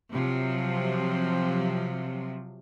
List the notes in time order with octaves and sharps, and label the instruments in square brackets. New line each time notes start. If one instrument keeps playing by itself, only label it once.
[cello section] C3 F3 F#3